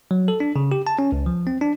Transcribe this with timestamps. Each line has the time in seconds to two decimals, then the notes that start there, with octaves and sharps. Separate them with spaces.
0.11 F#3
0.28 A4
0.40 D4
0.56 C#3
0.72 G4
0.87 A5
0.99 C#4
1.12 C#2
1.26 F3
1.47 C4
1.61 D4